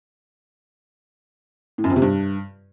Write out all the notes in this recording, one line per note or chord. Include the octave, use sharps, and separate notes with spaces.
A2
F#2
F2
C3
G2